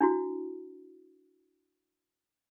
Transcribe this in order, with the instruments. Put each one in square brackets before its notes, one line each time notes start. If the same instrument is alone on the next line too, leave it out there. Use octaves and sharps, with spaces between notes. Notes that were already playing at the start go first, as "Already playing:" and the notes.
[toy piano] D4 E4 F#4